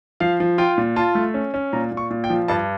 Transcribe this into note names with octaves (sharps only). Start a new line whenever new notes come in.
F3 F5
F3
F4 G5
A#2
F4 A5
A3
C#4
C#4
A#2 A#5
A#2
C#6
A#2
G5
F3
G2 A5